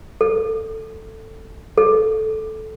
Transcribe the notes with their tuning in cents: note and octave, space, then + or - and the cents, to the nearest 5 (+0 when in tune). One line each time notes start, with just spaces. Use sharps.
A4 +10
A4 -10